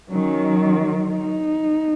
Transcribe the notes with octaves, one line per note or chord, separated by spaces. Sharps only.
D#3 F#3 C#4
D#4